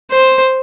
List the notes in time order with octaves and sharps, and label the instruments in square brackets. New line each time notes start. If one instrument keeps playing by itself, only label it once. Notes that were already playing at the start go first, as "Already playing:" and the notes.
[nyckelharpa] C5